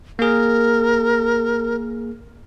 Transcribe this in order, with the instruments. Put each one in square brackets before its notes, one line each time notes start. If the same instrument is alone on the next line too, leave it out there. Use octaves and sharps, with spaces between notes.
[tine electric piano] A#3 G#4 [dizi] A#4